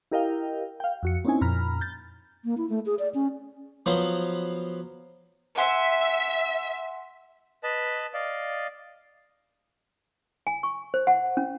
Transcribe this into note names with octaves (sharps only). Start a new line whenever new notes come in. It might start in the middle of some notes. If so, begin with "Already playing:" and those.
E4 G4 A#4 D#5 F5 G5
F5 G5
F2 F#4 C#7
A#3 C4 C#4 D#4 E4 G#5
F2 A#2 A#5 B5 F6
G6 A6
A#3
E4
A3
G#4
D5
C#4
F3 F#3 B3 C5
E5 F#5 G#5 C6
B4 D#5 A5
D5 D#5 F5
G#5
C#6
C5
F#5
C#4